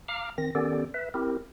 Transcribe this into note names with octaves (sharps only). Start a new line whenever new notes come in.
F5 A#5 D6 F6
D#3 C4 A#6
D#3 B3 C#4 G4 A4 D5
B4 E5
C4 E4 G4 A#4